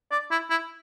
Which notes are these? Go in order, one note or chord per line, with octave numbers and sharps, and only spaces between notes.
D5
E4
E4